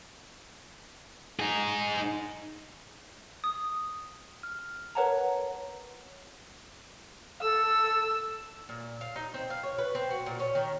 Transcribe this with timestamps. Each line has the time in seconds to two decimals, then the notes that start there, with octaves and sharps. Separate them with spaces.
1.40 D#4 G#4
3.44 D#6
4.43 F6
4.95 A#4 B4 C#5 F#5 A5 A#5
7.42 A4 E6
8.69 A#2
9.01 F5
9.16 D#4
9.34 C4
9.50 F5
9.63 C#5
9.78 B4
9.95 C4
10.10 F#4
10.26 A#2
10.40 C#4
10.55 D#3